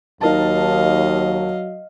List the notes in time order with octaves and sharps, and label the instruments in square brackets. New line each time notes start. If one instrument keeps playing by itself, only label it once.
[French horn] D#2 [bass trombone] F#3 [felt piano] D#4 A#4 A5 [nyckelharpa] D#5 F5